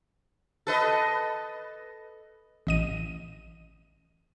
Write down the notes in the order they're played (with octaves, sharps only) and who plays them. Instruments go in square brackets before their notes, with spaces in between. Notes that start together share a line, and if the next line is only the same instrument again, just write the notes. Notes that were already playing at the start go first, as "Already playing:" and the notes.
[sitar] A4 B4 D#5
[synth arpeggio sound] A1 D#5 D#7